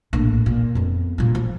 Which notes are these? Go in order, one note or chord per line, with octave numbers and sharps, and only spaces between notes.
A#1 A2
A#2
F2 B3
A#2 G3
F3